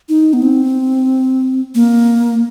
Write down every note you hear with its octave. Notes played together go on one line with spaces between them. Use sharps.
D#4
B3
C4
A#3